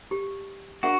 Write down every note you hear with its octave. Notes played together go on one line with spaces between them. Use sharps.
G4
D4 F#4 A#4 F#5